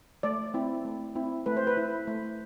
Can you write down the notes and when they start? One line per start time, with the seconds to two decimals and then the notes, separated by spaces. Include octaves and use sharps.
0.23 A3 D5
0.54 C4 E4
0.85 A3
1.15 C4 E4
1.46 A3 B4
1.57 C5
1.67 B4
1.77 E4
2.07 A3